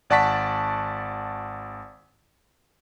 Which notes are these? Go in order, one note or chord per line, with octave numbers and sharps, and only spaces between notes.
G#1 D5 F#5 A5 C#6 B6